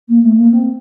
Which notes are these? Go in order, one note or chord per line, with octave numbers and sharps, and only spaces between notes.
A#3
A3
A#3
C4